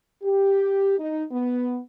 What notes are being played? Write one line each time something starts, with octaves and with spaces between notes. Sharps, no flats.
G4
D#4
B3